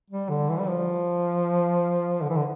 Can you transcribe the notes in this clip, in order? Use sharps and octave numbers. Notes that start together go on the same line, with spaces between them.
G3
D3
E3
G3
F3
D3
E3
D3